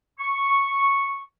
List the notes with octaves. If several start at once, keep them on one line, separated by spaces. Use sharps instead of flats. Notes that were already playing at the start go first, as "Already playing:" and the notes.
C#6